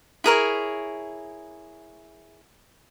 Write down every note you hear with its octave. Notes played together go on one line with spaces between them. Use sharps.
E4 G#4 A#4 C#5